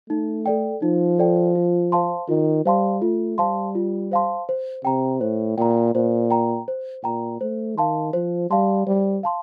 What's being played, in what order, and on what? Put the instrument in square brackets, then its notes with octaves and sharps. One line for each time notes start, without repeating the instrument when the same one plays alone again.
[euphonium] A3 [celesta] D#4
[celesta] A4 D5 G5
[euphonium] F3 [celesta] D#4
[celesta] A4 D5 G5
F4
C5 F5 A5 C6
[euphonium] D#3 [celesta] F4
[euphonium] G3 [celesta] C5 F5 A5 C6
[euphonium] A3 [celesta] F4
[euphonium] G3 [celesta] C5 F5 A5 C6
[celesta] F4
C5 F5 A5 C6
C5
[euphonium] C3 [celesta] G5 A#5
[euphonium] A2 [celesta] C5
[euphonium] A#2 [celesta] G5 A#5
[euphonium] A#2 [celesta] C5
[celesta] G5 A#5
C5
[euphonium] A#2 [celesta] G5 A#5
[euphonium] A3 [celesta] C5
[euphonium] D#3 [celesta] F5 A5 C6
[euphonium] F3 [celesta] C5
[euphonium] G3 [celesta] F5 A5 C6
[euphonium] G3 [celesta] C5
[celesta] F5 A5 C6